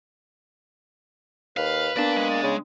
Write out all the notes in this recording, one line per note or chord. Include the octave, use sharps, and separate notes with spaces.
D#2 B4 F5
A#3 B3 D4 D5 A5
G#3
D5
C#3